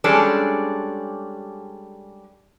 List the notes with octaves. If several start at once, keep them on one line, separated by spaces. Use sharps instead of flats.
G3 G#3 C#4 D4 G#4 A4